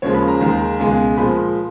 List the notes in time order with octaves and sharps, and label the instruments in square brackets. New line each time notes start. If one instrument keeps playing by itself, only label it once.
[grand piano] D#2 C#3 F3 G#3 C#5
B5
A#5
D#2 D#3 G#3 A#5
C#2 B2 G#3 G#5
A#2 F3 G#3 B5